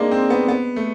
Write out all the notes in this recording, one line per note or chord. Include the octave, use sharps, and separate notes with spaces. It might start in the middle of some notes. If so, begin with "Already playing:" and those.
Already playing: G#3 A#3 C4 D4 D#4
C4
B3
B3
A3